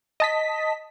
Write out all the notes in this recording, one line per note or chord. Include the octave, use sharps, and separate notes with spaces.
D#5 A5 B6